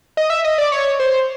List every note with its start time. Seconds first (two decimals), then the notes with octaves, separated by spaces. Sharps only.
0.17 D#5
0.30 E5
0.44 D#5
0.58 D5
0.72 C#5
1.00 C5